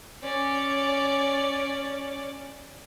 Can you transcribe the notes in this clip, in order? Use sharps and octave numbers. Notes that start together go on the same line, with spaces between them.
C#4 D5